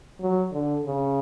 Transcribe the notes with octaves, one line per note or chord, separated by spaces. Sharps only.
F#3
D3
C#3